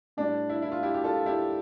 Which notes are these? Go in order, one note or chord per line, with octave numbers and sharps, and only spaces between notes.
A2 G3 D4
E4
E4
F4
E4 G4
G4
F4 A4
E4 G4